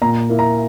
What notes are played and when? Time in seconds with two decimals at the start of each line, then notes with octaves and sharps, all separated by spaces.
0.02 A#2 A#5
0.29 A#3 E4
0.39 A#5